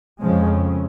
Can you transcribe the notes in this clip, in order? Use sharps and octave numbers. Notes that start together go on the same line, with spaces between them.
F2 C#3 F3 G#3